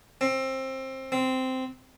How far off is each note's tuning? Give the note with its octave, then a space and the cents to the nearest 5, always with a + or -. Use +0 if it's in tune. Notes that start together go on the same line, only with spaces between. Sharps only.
C4 +20
C4 -10